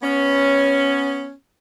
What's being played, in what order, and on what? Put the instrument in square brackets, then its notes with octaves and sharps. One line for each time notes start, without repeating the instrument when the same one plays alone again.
[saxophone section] B3 C#4